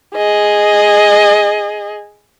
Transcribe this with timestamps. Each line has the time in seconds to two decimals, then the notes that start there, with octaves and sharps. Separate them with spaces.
0.15 G#4 D#5